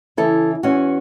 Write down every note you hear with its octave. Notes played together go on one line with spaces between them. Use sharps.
C#3 E3 E4 A4
E2 C#4 F#4